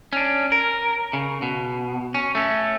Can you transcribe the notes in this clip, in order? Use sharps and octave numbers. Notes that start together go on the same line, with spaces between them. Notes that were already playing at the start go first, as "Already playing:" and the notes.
C#4 D4
A#4
C#3
B2
C#4
A3 C#4